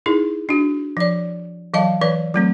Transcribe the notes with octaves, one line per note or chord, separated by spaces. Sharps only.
D#4 E4 G#4
D4 F#4
F3 D5
E3 F#3 D#5 F5 A5
E3 B4 D5
F#3 A3 C4